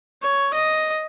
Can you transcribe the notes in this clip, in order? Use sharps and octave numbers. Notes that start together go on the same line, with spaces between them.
C#5
D#5